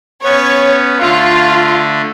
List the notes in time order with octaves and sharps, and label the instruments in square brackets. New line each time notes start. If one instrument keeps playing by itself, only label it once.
[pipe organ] B3 C#4 [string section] C#5
[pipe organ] D3 A3 [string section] F4